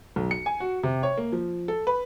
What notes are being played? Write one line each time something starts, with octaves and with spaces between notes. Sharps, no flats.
B1
C#7
G#5
F#4
C3
C#5
A#3
F3
A4
B4